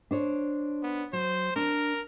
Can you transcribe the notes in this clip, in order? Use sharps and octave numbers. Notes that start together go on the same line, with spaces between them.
D4 C5 C#5
B3
F#3 C5
D4 A#4